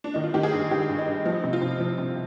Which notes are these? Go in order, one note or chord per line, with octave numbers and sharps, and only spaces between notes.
D4
D#3 D#4
F4
D#3 G4
G#4
G2
D#3 G4
G2
D#4
G2
F3 D#4
C3
F4
C3
F3
C3